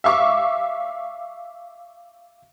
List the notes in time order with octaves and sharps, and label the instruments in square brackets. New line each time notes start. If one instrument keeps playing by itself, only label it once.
[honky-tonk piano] E5 F5 C#6 D6